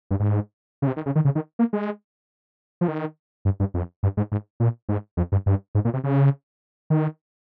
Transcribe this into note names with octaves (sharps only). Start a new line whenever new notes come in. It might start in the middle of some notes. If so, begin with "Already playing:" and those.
G2
G#2
C#3
C3
D#3
C#3
D#3
C#3
D#3
A#3
G#3
F3
D#3
G2
G2
F2
G2
G#2
G#2
A#2
G#2
F2
G2
G2
G#2
A#2
C3
C#3
D#3